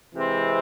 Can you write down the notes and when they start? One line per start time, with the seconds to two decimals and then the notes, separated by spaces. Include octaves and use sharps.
0.14 C3 E3 G#3 C4